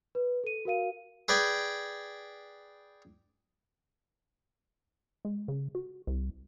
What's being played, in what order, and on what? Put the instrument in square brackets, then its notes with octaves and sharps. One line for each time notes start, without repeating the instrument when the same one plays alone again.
[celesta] B4
A4 D#7
F#4 A#4 F5 D#7
[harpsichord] G#4 B4 D5 G5 G#5
[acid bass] G#3
C#3
F#4
C2